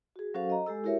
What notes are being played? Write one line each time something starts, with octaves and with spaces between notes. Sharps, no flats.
F#4 G#4
F#3 C#4 F#4 A4 C5 F5
D#5 A#5
G#3 G4 A4 E6
E4 F#4 G4 A#4 C#5 E5